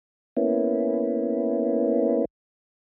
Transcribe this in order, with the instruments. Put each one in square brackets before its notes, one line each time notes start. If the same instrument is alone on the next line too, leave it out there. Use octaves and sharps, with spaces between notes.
[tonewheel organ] A#3 B3 C#4 E4